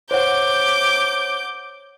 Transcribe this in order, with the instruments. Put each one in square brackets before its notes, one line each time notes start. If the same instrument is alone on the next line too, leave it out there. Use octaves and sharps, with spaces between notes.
[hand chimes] C5 C#5 F#5 [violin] D6 G6